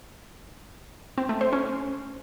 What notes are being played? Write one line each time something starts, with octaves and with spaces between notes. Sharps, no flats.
C4
A3
C5
C#4